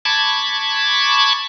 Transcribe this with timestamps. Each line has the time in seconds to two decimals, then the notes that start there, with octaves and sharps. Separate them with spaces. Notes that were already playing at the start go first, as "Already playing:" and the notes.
0.05 A5 B5 C#6 D6 G#6